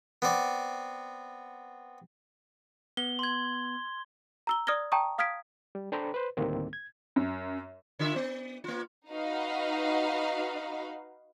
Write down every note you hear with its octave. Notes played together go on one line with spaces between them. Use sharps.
B3 C4 D5
B3 G7
C6 G#6
A#5 E6 G7
D5 D#6 F6 G#6 A#6 G7
G5 A5 A#5 C#6 D#6
F5 D#6 F6 G#6 B6 D7
G3
D4 A4 C5 G5 A#5 B5
B4 C5
D2 A2 D#3 G3 A#3 C4
G#6
F#2
D3 F4 E5
B3
A#3 F4
D#4 F#4 B4 F5